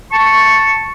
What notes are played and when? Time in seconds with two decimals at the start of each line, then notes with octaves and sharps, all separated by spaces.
0.12 A5 C#6